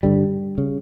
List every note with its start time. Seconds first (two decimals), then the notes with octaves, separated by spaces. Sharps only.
0.03 G2 D3 G3
0.58 C#3